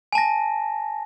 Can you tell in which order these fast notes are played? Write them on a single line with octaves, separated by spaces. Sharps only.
G#5 A5 A#6